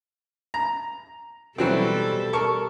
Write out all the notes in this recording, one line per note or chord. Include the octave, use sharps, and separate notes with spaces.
A#5
B2 E3 F#3 G3 C4 A4
A#4 A5 C#6